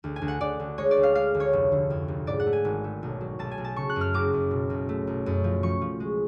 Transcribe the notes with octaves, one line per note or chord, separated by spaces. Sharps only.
D2
G#5
D2
F#5
D2 D5
D2
G#3 C#5
D5
D2
F5
G#3 F5
D2
C#5
F1
D3
F2
F1
G#2 D5
F#5
A3
G#5
G#1
A3
B1
F#3
B1 A5
G#5
B1
A5
C#3 C#6
F#6
F#2
F6
F#1 D6
F#2
B2
B1
A3
B1
F#2
F3
F3 C#6
F3
G#3